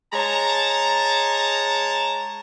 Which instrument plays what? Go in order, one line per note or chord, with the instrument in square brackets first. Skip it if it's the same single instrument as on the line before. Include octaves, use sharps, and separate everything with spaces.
[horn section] G#3 C#5 A5 A#5